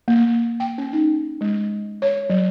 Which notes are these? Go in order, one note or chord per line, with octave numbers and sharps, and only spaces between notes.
A#3
G5
C#4
D#4
G#3
C#5
F#3